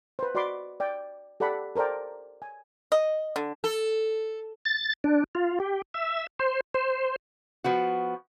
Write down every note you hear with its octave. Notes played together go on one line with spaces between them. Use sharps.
B4 C5
F#4 D5 D#5 B5 C6 D6
D5 G5
G4 A4 D5 F#5 B5
A4 A#4 C5 D5 G5
G#5
D#5
D3
A4
A6
D4
F4
G4
E5
C5
C5
F3 B3 F#4